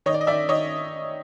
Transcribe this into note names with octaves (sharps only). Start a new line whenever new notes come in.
D#3 C#5 D#5
D5
D#5
D#3 D5 E5
D#3 C#5 D#5